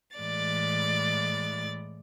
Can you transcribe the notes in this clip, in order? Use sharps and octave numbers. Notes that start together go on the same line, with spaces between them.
A2 E3 G#3 D5 A6